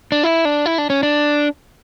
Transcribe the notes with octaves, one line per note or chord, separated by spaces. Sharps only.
D4
E4
D4
E4
D4
C#4
D4